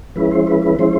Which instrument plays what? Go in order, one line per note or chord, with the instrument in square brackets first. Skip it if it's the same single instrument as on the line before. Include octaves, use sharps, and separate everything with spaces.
[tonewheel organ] F3 G#3 C#4 E4 B4
C5
B4
B4
F3 G#3 C#4 E4 C5